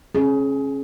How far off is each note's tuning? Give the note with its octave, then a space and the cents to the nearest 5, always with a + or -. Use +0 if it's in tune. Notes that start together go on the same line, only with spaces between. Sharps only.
C#4 -25 G#4 +25